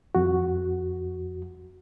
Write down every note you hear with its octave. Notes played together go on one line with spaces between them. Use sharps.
F2 F#4